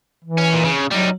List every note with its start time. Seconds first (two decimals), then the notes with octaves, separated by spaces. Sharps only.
0.24 E3
0.38 C#4
0.53 A#2
0.65 C#3
0.92 F#3 G3 D#4